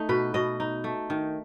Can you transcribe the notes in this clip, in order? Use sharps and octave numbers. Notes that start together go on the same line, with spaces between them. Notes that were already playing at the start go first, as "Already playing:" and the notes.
Already playing: A3 D#4
B2 B4
B2 D#5
D#4
A3
D#3